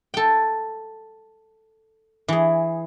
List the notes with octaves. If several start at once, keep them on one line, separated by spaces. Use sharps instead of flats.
A4 G5
E3 G#4